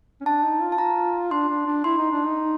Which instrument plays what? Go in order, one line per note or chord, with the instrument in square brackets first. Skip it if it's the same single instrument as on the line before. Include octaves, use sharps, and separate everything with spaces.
[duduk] C#4
[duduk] D4 [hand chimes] A5
[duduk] D#4
F4
[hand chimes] A5
[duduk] F4 [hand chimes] A#5
[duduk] D4 [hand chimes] C6
[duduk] D4
D4
[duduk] E4 [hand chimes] C6
[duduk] D#4
D4
D#4